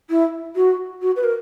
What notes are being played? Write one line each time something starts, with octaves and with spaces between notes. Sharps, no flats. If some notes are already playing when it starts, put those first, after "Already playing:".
E4
F#4
F#4
B4
A#4